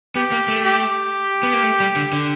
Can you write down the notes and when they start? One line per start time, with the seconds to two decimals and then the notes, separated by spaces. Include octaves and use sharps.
0.15 B3 G4
0.32 A#3
0.48 A3
0.65 G4
1.43 B3
1.54 A#3
1.63 A3
1.80 G3
1.96 D3
2.13 D3